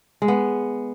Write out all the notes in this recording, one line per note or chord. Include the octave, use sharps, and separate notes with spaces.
G#3
B3